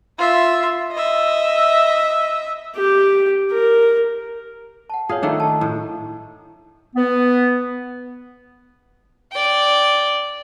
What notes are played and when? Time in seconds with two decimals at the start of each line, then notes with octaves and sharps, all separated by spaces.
0.19 F4 E5
0.92 D#5 E5
2.76 G4
3.52 A#4
4.90 F#5 A5
5.09 F4 G#4 C#5 F5
5.22 D#3 A3 D4
5.40 A5 A#5
5.61 A2
6.95 B3
9.31 D5 G5